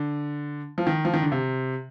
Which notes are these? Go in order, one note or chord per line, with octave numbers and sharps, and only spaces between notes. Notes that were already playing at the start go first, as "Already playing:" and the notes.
Already playing: D3
F3
D#3
F3
D#3
D3
C3